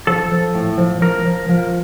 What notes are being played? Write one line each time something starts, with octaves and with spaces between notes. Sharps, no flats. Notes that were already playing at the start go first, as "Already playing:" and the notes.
F3 A4
F3
A2
F3
F3 A#4
F3
F3